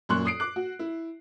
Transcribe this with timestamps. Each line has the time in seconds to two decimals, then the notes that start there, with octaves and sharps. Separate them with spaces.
0.09 F#2 A#2 C6 C#6 F#6
0.26 D#6 C7 D7
0.40 D6 F#6
0.56 F#4
0.79 E4